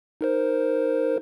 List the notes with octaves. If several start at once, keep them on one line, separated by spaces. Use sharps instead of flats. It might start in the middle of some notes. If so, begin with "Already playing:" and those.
D#4 A#4 C5